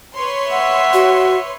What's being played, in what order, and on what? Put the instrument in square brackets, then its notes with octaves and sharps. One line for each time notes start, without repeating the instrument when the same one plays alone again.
[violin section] B4 C#5 C6
[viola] E5 [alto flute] F#5
[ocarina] F#4